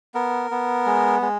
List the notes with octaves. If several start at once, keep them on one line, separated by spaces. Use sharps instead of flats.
B3 A#4
B3
G#3
G#3